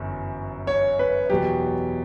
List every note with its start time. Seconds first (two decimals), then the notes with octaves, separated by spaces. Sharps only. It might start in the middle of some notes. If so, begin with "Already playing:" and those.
Already playing: G1 F#2 E3
0.67 C#5
0.99 B4
1.30 E2 B2 F#3 G4